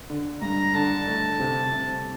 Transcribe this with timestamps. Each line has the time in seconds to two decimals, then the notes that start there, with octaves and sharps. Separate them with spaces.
0.10 D3
0.42 G2 A#5
0.74 D3 A5
1.07 A3
1.40 C3
1.72 C3